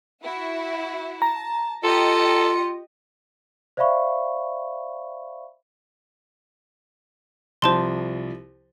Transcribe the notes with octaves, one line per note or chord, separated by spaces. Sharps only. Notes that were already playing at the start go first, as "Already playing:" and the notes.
E4 F#4 E5
A5 A#5
F4 G4 A4 D#5 C#7
C5 D5 E5 F5 B5 C#6
C2 F3 C5 A5 C6